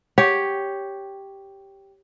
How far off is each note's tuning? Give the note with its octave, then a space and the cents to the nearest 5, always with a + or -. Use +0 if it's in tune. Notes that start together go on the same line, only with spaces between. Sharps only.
G4 +0 C#5 +0